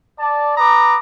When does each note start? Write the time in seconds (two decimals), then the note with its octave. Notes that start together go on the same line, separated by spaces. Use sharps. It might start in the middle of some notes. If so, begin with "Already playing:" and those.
0.19 D5 A5
0.56 B4 A#5 D6 D#6